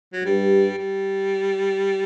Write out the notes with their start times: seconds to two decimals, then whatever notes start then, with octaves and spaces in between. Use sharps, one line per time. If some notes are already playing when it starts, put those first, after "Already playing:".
0.13 F#3
0.25 G2 G3
0.78 G3